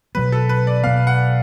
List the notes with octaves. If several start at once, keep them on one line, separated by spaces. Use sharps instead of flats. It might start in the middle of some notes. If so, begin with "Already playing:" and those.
B2 F#3 B3 B4
A4
B4
D5
B2 F#3 B3 F5
F#5